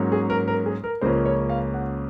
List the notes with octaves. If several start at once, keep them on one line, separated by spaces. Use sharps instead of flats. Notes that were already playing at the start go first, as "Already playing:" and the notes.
Already playing: G#2 F#3 A#3 C#4
G#4
A#4
A#4
G#4
A#4
C#2 C#3 F3 A#3 C#4 C5
C#5
F5
F#5